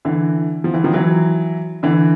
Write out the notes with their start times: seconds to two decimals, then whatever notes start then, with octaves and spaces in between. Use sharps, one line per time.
0.05 D3 E3
0.64 F3
0.74 E3
0.84 D#3 F3
0.94 E3 F#3
1.83 D3 E3